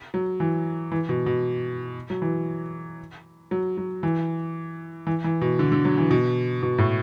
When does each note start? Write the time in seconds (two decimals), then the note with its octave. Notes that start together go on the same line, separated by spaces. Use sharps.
0.14 F#3
0.40 E3
0.92 E3
1.09 B2
1.26 B2
2.10 F#3
2.22 E3
3.51 F#3
3.77 F#3
4.03 E3
5.07 E3
5.24 E3
5.41 B2
5.59 D3
5.72 D3
5.85 F#3
5.98 E3
6.11 B2
6.62 B2
6.78 A2